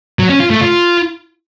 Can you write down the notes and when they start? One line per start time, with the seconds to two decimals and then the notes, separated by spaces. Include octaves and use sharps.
0.19 F#3
0.30 C#4
0.40 F4
0.50 A3
0.61 F4